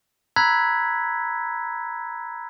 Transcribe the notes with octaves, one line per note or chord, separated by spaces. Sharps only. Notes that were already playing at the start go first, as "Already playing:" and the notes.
A#5 B5 E6 F#6 G#6 B6